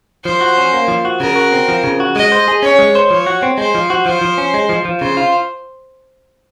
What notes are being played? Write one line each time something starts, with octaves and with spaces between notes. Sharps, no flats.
F3 C5
F#4
C#4
A#3
F3
F#4
C#3 A#4
F#4
C4
F3
C#3
F#4
G#3 D#5
C5
G#4
C#4 C#5
G#3
C5
F3 C#5
F#4
C4
G#3 C5
F3
F#4
F3 C5
F3
C#4
G#3
F3
F3
C#3 C5
F4